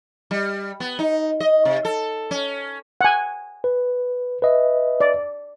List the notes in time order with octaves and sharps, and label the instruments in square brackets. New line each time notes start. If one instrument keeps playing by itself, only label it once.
[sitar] G3
B3
D#4
D#5
C3
A4
C#4
[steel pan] F#5 G#5
[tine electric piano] B4
B4 D#5 E5
[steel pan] D5